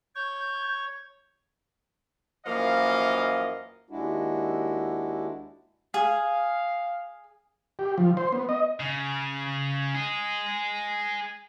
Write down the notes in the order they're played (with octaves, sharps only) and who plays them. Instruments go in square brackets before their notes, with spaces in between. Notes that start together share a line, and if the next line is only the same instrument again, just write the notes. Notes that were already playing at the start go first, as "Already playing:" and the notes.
[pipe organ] C#5 C#6 [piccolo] G6
[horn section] F#2 E3 F3 A#3 D#5 F5
[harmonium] D#2 G#3 D4 E4 F#4
[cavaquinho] G#4 [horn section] F5
[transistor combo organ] G4
F3
C5
B3
D#5
[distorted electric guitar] C#3
G#4 D#5